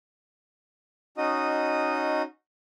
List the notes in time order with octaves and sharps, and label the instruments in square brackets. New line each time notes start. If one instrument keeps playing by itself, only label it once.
[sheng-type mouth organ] C#4 D#4 F#4 D#5 D#6